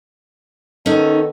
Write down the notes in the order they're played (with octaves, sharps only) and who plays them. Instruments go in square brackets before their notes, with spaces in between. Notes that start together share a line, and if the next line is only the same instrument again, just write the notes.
[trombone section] D#3 B3 A4 [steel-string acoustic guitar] C#4 D#4